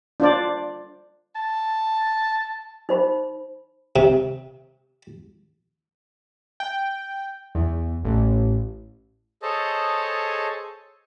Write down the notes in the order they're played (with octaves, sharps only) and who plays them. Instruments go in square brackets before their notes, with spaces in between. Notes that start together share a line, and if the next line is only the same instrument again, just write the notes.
[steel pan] D4 F4 C5 D5
[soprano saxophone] A5
[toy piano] D#4 C5 B5
[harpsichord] C3
[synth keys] G5
E2
A1
[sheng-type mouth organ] G#4 A4 C5 C#5 D#5 A5